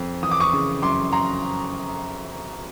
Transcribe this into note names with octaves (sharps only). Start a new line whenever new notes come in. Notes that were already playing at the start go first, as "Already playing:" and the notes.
Already playing: F2
E3 D#6
D6
C#6 D#6
C#3
F#2 C6 D6
F#2 A#5 C6